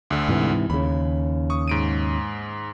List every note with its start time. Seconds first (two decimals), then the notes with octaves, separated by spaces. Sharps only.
0.10 D2 D3
0.29 G#2 C3 E3
0.70 D#2 C#3 B5
1.50 C#6 D#6
1.68 G#2 D7 D#7